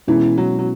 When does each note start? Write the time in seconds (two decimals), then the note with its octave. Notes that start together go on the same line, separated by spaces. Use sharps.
0.07 B2 E3 G#3 C#4 E4
0.38 F#3
0.59 F#3